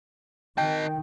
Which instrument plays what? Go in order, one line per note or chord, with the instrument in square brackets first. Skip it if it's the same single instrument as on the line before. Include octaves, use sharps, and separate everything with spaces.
[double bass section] D#3 [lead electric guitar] D#5 A5 [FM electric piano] G5